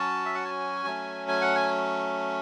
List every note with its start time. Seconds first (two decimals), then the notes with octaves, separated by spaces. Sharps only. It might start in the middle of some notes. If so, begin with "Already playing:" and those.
Already playing: F#3 C#4 F#4 A5
0.26 E5
0.35 F#5
0.45 G#5
0.86 F#3 A3 C#4
1.28 G#5
1.41 F#5
1.55 G#5